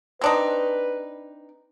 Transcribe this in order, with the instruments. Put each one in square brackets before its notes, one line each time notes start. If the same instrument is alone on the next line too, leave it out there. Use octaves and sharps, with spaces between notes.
[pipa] C4 D4 D#4 [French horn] B4